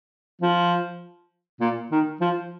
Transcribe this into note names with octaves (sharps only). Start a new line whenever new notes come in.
F3
A#2
D#3
F3